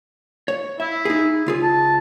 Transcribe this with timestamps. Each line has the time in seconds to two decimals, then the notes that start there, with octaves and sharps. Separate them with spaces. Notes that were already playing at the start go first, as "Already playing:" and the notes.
0.48 C#5
0.80 E4 E5
1.05 D#4 G#4
1.46 C#2 F4 G#4
1.62 A5